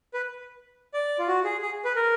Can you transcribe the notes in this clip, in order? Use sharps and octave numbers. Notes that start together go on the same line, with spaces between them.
B4
D5
F4
F#4
G#4
G#4
B4
A#4